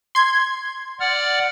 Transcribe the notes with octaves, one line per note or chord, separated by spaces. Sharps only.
C6 G#6
D5 F#5 F6